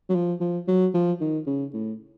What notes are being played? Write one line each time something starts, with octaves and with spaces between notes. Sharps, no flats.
F#3
F3
F3
F#3
F3
D#3
C#3
A2